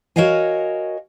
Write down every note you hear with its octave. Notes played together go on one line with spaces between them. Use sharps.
F#4 A#4 C#5 D#5 F5 G#5